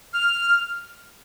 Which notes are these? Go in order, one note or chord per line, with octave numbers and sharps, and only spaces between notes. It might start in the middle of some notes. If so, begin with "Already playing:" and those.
F6